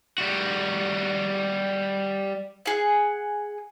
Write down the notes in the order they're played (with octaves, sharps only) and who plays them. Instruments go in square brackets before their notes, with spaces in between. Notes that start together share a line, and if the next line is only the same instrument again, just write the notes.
[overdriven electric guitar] G3 F#4
[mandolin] G#4 F#5